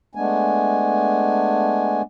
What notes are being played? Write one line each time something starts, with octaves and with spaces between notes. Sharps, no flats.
G#3 A3 B3 D4 G#5